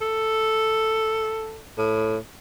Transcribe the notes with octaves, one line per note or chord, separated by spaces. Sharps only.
A4
A2